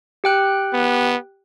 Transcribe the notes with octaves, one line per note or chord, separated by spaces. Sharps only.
G4 G5 F#6
B3